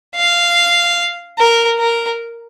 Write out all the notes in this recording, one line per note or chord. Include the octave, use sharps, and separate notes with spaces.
F5
A#4
A#4